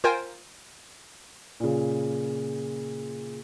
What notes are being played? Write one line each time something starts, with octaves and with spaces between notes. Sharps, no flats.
F4 A#4 C5 G5 G#5
A#2 C#3